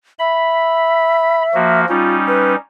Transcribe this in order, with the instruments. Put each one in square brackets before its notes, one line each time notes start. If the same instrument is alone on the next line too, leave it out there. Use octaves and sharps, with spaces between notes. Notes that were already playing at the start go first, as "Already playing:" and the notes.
[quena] E5 [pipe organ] B5
[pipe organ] F3 A#3 F#4
[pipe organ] G3 C#4 D#4 [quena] F4
[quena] B4